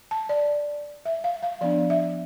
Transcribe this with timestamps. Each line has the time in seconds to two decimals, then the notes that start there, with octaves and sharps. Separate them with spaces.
0.11 A5
0.29 D5
1.06 E5
1.24 F5
1.43 F5
1.61 F3 B3 D4 D5
1.90 E5